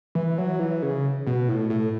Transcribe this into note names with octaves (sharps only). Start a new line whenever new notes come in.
E3
F#3
E3
C#3
B2
A2
A2